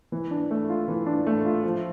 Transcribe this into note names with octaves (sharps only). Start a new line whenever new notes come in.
E3
D4
A3
F4
E3
D4
A3
F4
F3